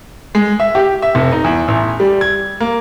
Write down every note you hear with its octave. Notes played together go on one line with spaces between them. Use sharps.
G#3
E5
G4
E5
F1
D#4
E2
A1
G3
G#6
A#3